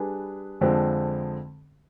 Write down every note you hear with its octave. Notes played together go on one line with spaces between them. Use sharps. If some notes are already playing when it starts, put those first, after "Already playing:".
Already playing: G3 D4 G#4 B4
F2 D3 F3 G#3 C4